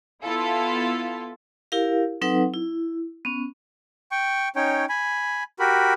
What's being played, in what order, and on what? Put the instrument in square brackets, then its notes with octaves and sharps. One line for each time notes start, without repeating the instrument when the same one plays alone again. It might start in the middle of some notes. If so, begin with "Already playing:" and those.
[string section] B3 E4 F4 A4
[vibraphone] E4 G4 A#4 F5
F#3 C4 D#4 A4 B4 F#5
E4
B3 C#4
[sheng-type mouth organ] G5 C#6
C#4 D#4 C#5 G5
G#5 B5
F#4 G4 A#4 B5